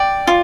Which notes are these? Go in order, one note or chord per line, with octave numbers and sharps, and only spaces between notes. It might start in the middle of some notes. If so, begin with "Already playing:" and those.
Already playing: D5 G5
F4